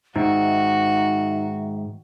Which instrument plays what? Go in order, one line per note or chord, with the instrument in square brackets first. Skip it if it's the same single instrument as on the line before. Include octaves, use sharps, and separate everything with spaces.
[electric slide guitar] G#2 D#3 [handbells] D#4 [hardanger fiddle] F#4 [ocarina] E5